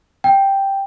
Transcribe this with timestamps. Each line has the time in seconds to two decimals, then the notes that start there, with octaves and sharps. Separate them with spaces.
0.24 G5